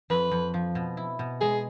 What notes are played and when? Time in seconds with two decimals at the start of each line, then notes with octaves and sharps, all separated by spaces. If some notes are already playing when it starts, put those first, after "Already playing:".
0.10 F2 B4
0.32 F2
0.54 F3
0.75 B2
0.97 E4
1.19 B2
1.41 G#3 G#4